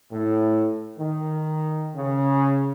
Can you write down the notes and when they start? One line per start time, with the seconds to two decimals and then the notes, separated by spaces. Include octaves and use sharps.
0.11 A2
0.98 D#3
1.96 C#3